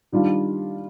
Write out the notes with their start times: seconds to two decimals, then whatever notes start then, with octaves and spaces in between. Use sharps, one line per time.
0.12 D#3 G3 D4 F4